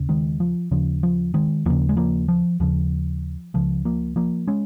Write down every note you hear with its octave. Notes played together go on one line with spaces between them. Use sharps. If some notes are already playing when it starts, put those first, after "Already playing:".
Already playing: D#2 C#3
D#3 G#3
F3
D#2 C#3 F3
F3
D#3 G#3
D#2 C#3 F3 A#3
G#3
F3 A#3
F3
D#2 C#3 F3
C#2 C#3 F3
F3 A#3
F3 A#3
G#3 C#4